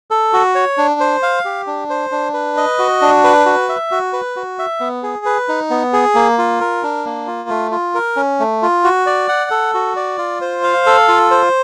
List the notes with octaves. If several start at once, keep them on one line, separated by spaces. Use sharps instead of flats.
A4
F#4
C#5
D4
C5
F5
G4
D4
C5
D4
B4
D#5
F#4
D4
B4
F#4
E5
F#4
B4
F#4
E5
B3
G#4
B4
D#4
B3
G#4
A#3
F4
A#4
D4
A#3
F4
A3
F4
A#4
C#4
A3
F4
F#4
D5
F#5
A4
F#4
D5
F4
C5
F5
A4
F4
C5